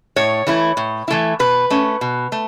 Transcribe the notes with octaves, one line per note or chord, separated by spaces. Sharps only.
A2 C#5
E3 A3 E4
A2
E3 A3 E4
B2 B4
A3 C#4
B2
A3